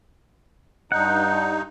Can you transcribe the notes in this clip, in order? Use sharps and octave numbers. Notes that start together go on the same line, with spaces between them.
G2 D#4 F#5